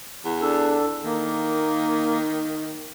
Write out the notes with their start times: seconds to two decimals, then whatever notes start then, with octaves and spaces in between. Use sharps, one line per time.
0.25 E2
0.41 D4 A4
1.04 D#3 A#3